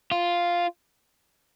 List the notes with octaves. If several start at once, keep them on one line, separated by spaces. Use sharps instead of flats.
F4